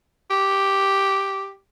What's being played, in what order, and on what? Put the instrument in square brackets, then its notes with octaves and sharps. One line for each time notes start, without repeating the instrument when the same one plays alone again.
[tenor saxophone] G4